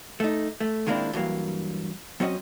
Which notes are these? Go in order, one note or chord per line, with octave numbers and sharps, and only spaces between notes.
A3 D#4
A3
D#3 G#3 A#3 C4 D4 E4
G2 E3 F#3 A#3
F#3 C4 C#4 D#5